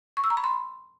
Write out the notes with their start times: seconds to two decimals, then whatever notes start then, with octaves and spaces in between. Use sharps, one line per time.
0.17 C#6
0.24 E6
0.30 A#5
0.37 B5
0.44 C6